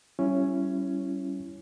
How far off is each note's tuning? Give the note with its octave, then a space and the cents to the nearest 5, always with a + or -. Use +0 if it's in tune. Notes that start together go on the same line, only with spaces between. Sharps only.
G3 -30 C#4 +0 E4 +20